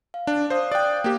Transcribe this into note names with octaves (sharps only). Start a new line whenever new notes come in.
F5
D4
C5 D5 F5 D#6
D5 G5 D#6 F#6
A#3 G4